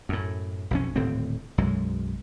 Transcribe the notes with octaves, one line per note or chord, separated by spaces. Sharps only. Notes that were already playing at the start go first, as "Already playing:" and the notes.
F#2 A2
B1 F2 C#4
D#1 A2 D3 C4
B1 F#2 G#3